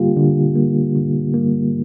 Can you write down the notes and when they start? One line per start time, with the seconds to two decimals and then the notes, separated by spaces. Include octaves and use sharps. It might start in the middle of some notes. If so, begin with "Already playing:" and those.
Already playing: D3 G3 A#3 F4 G4
0.16 D3
0.56 G3 A#3
0.96 D3
1.34 G3 A#3